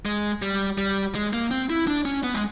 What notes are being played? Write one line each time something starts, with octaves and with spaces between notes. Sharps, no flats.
G#3
G3
G3
G#3
A#3
C4
E4
D4
C#4
B3
G#3